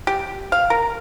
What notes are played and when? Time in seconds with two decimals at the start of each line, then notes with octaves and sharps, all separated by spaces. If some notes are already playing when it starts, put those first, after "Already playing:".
0.07 G4
0.52 F5
0.70 A#4